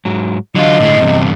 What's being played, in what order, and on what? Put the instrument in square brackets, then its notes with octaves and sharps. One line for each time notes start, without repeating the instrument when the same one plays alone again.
[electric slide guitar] G#2 F#3
[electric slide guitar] D3 [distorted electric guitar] F#3 F4 [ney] D#5
[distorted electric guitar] A2 G#3
[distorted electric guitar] E2 G2 [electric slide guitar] C3